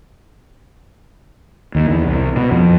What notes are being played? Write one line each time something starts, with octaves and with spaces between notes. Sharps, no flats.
D#2
E2
C2
B2
F2